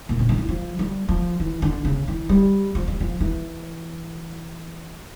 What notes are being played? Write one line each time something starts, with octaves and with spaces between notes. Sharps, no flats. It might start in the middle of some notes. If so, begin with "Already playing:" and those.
A#2
C#3
D3
E3
F3
G3
F3
E3
D3
C#3
E3
G3
F3
G3
F3
E3